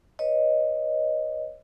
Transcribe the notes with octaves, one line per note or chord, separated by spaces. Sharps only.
B4 C#5 D#5